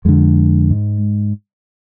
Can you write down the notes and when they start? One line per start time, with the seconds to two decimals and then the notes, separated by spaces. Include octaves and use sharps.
0.05 F2 D3 G#3
0.70 G#2